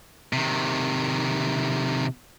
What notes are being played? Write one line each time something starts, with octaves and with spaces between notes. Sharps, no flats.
C3 D#3